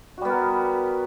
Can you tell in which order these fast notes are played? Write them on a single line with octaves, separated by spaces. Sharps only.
F#4 G3 B3 A#4